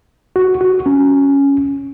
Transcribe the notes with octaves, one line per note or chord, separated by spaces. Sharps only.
F#4
F#4
C#4